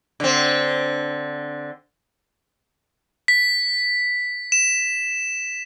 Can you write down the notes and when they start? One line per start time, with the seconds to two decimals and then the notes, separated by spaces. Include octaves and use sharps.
0.20 D3 C4
3.28 B6
4.52 E7